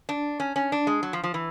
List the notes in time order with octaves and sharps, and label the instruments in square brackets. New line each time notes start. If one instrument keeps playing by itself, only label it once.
[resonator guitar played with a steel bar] D4
C#4
C#4
D4
G#3
F#3
F3
F3
E3